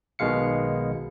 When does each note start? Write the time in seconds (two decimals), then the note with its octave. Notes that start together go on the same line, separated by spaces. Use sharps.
0.19 B1 B2 D#3 G#3 F5 C#7